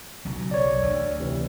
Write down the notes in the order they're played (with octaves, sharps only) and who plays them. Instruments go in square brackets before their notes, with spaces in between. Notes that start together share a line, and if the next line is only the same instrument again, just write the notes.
[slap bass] B1 C#3 F#3
[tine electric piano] C#5 D5
[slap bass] D2
[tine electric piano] C3 E3